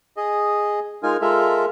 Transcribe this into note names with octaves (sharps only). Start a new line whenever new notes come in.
G#4 D#5
G#3 D#4 F4 A#4 G#5
G#3 F4 A4 A#4 E5